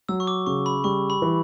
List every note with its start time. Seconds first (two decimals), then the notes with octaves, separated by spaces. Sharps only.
0.09 F#3 E6
0.20 C#6
0.27 D6
0.46 C#3 C#6
0.66 B5
0.84 G3 C#6
1.10 B5
1.22 E3